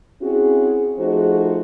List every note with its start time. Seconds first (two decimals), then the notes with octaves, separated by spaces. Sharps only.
0.22 C4 C#4 E4 F#4 G#4
0.99 F3 A3 D#4 F#4 G#4 C5